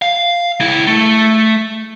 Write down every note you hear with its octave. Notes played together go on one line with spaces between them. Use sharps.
F5
C#2 E4
A3